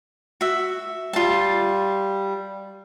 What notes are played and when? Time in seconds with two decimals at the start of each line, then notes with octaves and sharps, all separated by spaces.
0.41 F#4 E5
1.13 G3 F4 A5